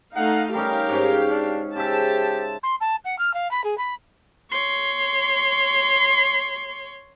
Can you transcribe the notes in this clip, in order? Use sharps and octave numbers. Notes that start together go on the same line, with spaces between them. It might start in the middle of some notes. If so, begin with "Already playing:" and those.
A3 D#4 F5 F#5
G3 C#4 D#4 G4 A#4 F5
G#2 C#4
D4
C#3 G4 C5 E5 A5
C6
A5
F#5
F6
F5
B5
G#4
B5
C#5 C6